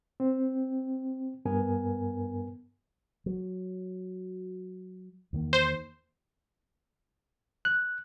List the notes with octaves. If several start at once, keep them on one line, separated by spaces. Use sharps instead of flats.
C4
G2 B3 A#4 G#5
F#3
E2 D#3 A#3
C5
F#6